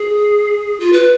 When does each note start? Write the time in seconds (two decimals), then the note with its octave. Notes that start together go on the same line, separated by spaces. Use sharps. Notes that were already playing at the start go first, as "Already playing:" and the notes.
Already playing: G#4
0.80 F4
0.93 B4